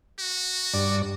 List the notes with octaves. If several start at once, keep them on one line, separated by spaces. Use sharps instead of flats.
F#4
G2 D5